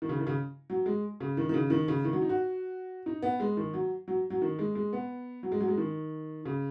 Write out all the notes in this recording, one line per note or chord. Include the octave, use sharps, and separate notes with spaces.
D#3
C#3
D#3
C#3
F#3
G#3
C#3
D#3
D#3
C#3
D#3
C#3
D#3
F#3
D#4
F#4
D#4
B3
G#3
D#3
F#3
F#3
F#3
D#3
G#3
G#3
B3
F#3
G#3
F#3
G#3
D#3
C#3